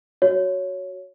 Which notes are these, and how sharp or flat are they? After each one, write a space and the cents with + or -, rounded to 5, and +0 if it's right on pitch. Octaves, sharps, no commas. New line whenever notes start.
F#4 +5 C#5 +5